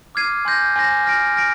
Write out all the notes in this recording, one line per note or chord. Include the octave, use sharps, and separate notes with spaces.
D6 F6 G#6 C7 D#7
G#5 C6 G6 A#6
G#5 C6 G6 A#6
F6 A#6 D7
F6 A#6 D7